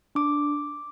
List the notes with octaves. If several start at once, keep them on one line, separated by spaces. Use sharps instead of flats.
D4 D6